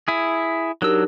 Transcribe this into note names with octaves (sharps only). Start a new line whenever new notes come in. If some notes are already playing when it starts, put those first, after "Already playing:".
E4 G#4
F#3 D4 D#4 G4 A#4 E6